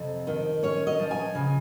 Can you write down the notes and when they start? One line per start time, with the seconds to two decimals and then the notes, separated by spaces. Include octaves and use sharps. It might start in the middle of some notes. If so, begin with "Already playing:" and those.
Already playing: F2 C3
0.27 D#3
0.63 C#4 C#5
0.87 D#5
0.99 F3
1.11 G#5
1.35 C#3